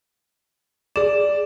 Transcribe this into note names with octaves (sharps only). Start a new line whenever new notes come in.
G#4 D5 E7